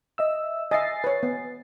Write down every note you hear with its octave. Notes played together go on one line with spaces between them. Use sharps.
D#5 E5 E6
D#5 E5 G#5 A6 C7
B4 C#5
B3